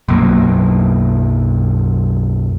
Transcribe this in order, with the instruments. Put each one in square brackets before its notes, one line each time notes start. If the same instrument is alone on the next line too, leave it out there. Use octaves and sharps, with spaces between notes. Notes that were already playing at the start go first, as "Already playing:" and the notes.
[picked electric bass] B1 F#2 F#3 A#3